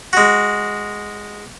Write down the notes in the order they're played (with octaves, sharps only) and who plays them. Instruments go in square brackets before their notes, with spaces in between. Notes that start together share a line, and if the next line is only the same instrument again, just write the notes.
[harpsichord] G#3 F#4